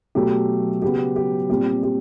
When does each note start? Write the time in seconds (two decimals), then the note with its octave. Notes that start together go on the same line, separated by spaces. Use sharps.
0.15 B2 F#3 A3 G4
0.82 C#3 F#3 B3 G4
1.16 G4
1.49 A#2 G3 C4 G4
1.83 G4